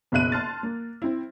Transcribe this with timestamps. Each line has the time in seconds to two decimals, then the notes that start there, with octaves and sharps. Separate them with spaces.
0.12 F#1 B1 B2 E5 F#6 D#7
0.32 A5 C6 F6 A6
0.63 A#3
1.02 C4 E4